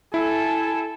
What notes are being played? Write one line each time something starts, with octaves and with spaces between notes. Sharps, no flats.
E4 A4 G#5